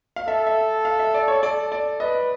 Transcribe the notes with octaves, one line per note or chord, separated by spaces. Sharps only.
F5
A4 E5
E5
F5
E5
D5
C#5
A4 D5
D5
B4 D#5